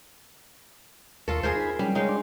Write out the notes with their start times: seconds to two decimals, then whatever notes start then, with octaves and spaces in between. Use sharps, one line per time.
1.28 D#2 F4 A4 A#4 C#6
1.43 D#2 G#4 A#4 C5
1.55 D#4 G#5 B5
1.79 F#3 G3 C#4
1.95 G#3 D#4 C#5 F5
2.09 D4 D5 C6